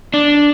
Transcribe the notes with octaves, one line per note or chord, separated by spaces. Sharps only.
D4